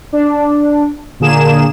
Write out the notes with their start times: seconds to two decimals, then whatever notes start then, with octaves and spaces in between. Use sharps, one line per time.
0.13 D4
1.20 A#2 D3 A#3 G#4 E7